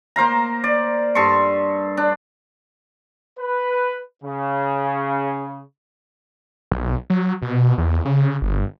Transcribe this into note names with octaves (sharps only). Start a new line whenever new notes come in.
A#3 C5 F5 A#5
D5
G2 A4 C6 C#6
D4
B4
C#3
B1
F#3
B2
E2
C#3
G1